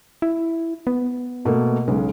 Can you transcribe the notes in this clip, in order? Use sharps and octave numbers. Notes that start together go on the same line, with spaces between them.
E4
B3
B2 A3 A#3
B1 C#3 G#3